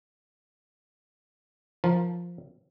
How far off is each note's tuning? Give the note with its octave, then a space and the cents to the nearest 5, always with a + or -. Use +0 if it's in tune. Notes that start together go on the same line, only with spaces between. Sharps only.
F3 +0 A#4 +0